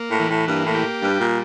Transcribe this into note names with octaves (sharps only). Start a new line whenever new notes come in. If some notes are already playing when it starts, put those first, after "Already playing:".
Already playing: A#3
A2
E3
A2
G2 A#3
A2
G4
G2 G3
A#2